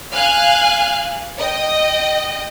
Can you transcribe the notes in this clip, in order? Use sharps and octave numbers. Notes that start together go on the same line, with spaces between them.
F5 G#5 F6 F#6
D#5 G5